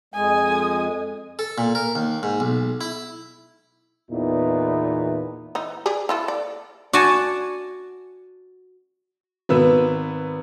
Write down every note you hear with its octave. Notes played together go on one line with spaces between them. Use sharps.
F2 G#3 G#5 D#6
A4
A#2
A#4
D#2
G#2
B1
E4
E2 A#2 E3 B3 D#4 E4
E3 D#4
G4 G#4 D5
E4 F4 A4
D5
F#4 D5 F#5 G#5 A5
G#1 B3 B4 E6